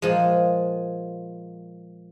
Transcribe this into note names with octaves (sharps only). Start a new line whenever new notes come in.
A#2 F3 G#3